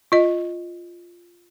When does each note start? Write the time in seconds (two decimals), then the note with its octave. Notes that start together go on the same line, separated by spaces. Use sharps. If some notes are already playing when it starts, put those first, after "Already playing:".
0.12 F4 D#5